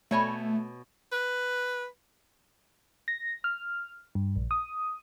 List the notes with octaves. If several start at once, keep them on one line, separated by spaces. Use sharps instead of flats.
B2 A3 C#5 G#5
B4
A#6
F6
G2
A#1
D#6